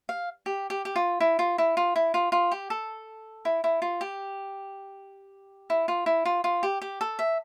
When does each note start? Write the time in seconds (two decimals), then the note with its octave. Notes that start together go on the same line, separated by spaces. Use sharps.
0.09 F5
0.46 G4
0.70 G4
0.85 G4
0.96 F4
1.21 E4
1.39 F4
1.58 E4
1.77 F4
1.96 E4
2.14 F4
2.32 F4
2.52 G4
2.70 A4
3.45 E4
3.64 E4
3.82 F4
4.01 G4
5.70 E4
5.88 F4
6.06 E4
6.25 F4
6.44 F4
6.63 G4
6.82 G4
7.01 A4
7.19 E5